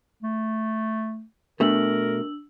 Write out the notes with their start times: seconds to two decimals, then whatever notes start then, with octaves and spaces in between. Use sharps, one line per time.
0.23 A3
1.60 B2 A3 D4 A#4 E6 F#7